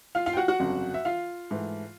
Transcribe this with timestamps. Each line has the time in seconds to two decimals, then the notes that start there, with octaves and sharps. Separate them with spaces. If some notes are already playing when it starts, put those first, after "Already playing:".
0.15 F4 F5
0.26 F4 F5
0.33 G5
0.37 F#4 F#5
0.48 F#4 F#5
0.60 G1 F2 C#3 F#3
0.94 E5
1.05 F4 F5
1.51 G#2 E3 A3